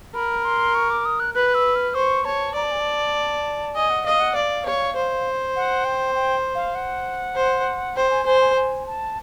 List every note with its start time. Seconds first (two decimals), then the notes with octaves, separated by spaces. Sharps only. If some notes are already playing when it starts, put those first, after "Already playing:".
0.15 A#4 B5
0.45 C6
0.75 C#6
0.90 D6
1.05 D#6
1.20 F#6
1.34 B4 F#6
1.54 E6
1.75 F6
1.95 C5 C#6
2.25 C#5 A5
2.55 D5 A#5
2.63 A5
2.71 G#5
2.80 A5
3.75 D#5 G#5
3.90 F#5
4.05 D#5 F5
4.20 F#5
4.35 D5 F5
4.65 C#5
4.96 C5
5.56 F#5
5.85 G5
6.15 G5
6.55 F5
6.75 F#5
7.35 C5
7.96 C5 G5
8.10 G#5
8.26 C5 G#5
8.41 G#5
8.56 G#5
8.86 A5